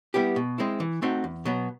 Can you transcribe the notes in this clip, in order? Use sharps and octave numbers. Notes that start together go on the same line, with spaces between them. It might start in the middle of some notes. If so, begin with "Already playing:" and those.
G3 B3 E4 G4
B2
G#3 C4 E4
E3
A3 C4 D#4 F#4
E2
B2 F#3 B3